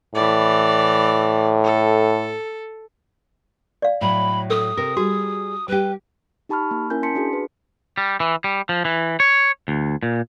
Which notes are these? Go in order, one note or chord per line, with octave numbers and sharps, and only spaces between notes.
A2 E3 D5
A4
D5 F5
A2 F#3 B5
A4 D#6
C3 A#4
G3 F#4 G#4
G3 G4 B4
D#4 G4 A5 B5 C#6 F6
A#3
C#4 E4 A#4 G#5 G6
A5 C6 B6 C#7
D4 F#4 G#4
B4
G3
E3
G3
F3
E3
C#5
D2
A#2